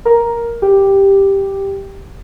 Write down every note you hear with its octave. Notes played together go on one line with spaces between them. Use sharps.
A#4
G4